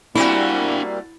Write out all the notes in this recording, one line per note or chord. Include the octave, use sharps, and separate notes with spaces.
G3 A3 A#3 C4 D4 E4 F#4 G#5